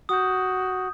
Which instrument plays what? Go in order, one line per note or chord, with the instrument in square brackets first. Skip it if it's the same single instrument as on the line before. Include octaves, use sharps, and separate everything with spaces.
[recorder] F#4 [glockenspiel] D#6 G6